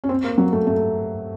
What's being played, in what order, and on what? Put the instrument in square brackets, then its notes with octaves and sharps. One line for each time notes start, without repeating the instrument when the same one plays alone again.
[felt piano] C#4
C4
A#3
F#3
A3
A3